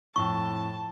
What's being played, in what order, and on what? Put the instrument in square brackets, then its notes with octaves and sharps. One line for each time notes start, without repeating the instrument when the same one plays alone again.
[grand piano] F2 A2 E6 [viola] A5 [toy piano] C#6